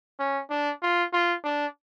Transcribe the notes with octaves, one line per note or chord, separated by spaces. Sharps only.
C#4
D4
F4
F4
D4